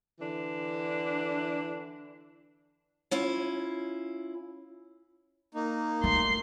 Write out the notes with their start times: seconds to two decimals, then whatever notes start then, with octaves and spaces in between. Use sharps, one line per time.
0.20 D3 E3 D4
3.11 C#4 E4 F4
5.54 A#3 D#4
6.04 A3 C6 C7